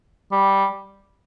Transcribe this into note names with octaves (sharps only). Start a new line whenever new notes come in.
G3